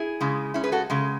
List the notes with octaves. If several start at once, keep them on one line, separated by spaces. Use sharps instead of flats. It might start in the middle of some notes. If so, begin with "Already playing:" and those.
Already playing: E4 G#4
C#3 G#3
C#4 E4
G#4 B4
F#4 A4
C#3 G#3